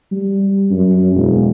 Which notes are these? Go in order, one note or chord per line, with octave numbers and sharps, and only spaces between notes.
G3
F#2
E1